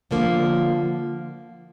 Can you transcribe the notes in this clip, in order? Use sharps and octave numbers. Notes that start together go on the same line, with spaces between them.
D3 F3 A#3